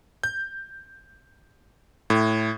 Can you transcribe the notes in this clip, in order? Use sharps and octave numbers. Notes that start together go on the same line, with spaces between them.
G6
A2